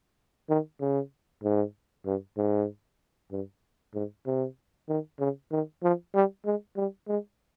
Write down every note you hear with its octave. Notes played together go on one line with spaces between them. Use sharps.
D#3
C#3
G#2
G2
G#2
G2
G#2
C3
D#3
C#3
D#3
F3
G3
G#3
G3
G#3